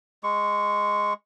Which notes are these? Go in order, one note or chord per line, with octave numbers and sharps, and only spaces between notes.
G#3 C#6